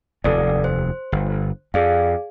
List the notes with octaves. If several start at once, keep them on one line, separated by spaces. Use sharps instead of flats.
F1 D#2 A4 D5
C5
G1
F2 G#4 D5 F5